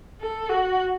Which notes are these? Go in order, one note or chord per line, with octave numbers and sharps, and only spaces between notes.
A4
F#4